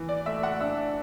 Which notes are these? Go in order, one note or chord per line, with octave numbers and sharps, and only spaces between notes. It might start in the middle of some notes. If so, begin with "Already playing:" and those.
Already playing: E3
D5
A3 E5
F#5
D4 E5